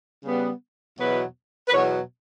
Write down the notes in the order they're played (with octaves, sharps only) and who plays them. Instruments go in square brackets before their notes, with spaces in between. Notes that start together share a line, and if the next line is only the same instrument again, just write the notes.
[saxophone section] C#3 G3 B3
E2 B2 F#3 B3 B4
B4
E2 B2 F#3 B3 C#5